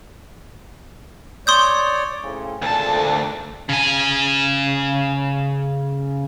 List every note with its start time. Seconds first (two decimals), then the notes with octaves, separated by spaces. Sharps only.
1.47 C#5 D5 C6 D#6 G6
2.22 A2 C#3 C4
2.62 G#1 D2 A#2 A4 A5
3.69 C#3 G#5